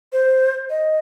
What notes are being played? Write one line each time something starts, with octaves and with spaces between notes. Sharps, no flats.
C5
D#5